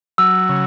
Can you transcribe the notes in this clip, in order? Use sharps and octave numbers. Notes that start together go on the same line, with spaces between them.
F#3 E6
C#3